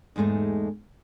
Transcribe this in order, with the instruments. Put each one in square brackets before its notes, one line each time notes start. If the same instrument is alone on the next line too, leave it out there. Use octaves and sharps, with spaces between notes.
[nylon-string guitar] E2 G#2 G#3 A3 D#4